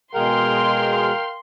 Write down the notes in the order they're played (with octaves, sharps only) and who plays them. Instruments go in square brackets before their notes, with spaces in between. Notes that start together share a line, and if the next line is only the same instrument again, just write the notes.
[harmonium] B2 G#3 G#4 [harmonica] A#4 F5 G5 [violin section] C6